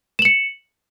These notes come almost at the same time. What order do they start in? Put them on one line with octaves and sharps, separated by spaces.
E7 F#7 C#7